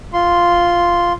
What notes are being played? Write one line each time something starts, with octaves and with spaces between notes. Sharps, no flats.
F4 C6